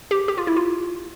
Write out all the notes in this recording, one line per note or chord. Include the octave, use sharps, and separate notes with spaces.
G4
G4
F4
E4
F4